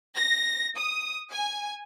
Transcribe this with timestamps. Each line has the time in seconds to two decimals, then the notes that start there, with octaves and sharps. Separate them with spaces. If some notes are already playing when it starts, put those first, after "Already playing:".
0.16 A#6
0.77 D#6
1.31 G#5